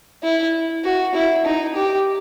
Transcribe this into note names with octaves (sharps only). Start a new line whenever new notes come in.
E4
F#4
E4
D#4
G4